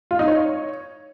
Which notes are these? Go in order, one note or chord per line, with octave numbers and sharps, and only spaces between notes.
F4
D#4
C#5